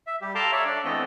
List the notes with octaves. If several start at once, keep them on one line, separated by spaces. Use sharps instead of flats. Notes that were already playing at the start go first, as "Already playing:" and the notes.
E5
G3 G4
A4 F5 A5 A#5 C6 D6
C#5 D5 E5
D4 D5
E3 A3 B3 C4 A4 D#5